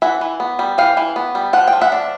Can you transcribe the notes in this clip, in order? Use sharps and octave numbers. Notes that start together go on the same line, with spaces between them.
E3 E5 F#5
E3
B3
G3
E3 F5 G5
E3
B3
G3
F3 F#5
G5
F3
E5 F#5
D4